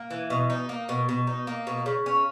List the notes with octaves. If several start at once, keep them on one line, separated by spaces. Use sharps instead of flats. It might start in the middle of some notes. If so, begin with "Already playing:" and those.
Already playing: A#3
E3
B2
D#4
A#3
B2
B2
D#4
A#3
B2
C#3
C#4